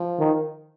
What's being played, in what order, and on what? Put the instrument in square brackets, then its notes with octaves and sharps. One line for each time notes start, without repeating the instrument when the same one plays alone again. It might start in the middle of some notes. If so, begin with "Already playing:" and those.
Already playing: [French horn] F3
[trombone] D#3